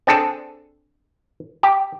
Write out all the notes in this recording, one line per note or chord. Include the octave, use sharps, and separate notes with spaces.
C4 D4 G#4 A4
G4